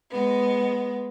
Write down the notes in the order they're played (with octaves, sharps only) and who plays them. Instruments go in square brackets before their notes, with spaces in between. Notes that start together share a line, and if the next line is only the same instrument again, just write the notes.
[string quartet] G#3 B3